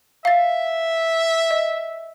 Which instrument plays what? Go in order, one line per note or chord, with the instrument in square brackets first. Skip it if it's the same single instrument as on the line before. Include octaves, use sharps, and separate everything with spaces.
[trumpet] E5 [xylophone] F5 A6
[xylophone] D#5